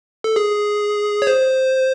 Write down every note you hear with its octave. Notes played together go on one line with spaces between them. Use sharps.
A4
G#4
C#5
C5